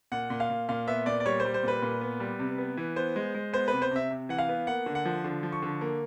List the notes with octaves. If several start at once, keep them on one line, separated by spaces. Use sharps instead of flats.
A#2 F#5
A#2
F5
A#2
A#2 F5
B3 E5
A#2 D5
D5
G3 C#5
C5
G3
C5
A#2 B4
A#2
B3
G3
C3
B3
E3
B3 C5
G#3
G#3
B3 C5
C3 B4
C5
C3 E5
C3
E3 F#5
F5
B3
A#3 F#5
D3
F#5
F3
D3
F3
C#6
D3
A#3